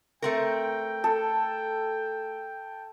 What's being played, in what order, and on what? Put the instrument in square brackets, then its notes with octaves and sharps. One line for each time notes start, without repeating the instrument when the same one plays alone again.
[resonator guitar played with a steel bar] A3 C4 A#4 [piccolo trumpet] G5
[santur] A4